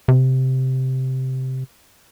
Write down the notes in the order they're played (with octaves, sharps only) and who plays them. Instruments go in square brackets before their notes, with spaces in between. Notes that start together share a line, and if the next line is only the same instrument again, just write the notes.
[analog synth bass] C3